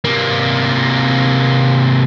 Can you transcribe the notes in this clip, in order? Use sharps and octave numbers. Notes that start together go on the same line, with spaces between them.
C3 A#3